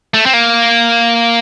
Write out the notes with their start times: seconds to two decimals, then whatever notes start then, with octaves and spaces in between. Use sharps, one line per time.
0.14 A3
0.26 C4
0.33 A#3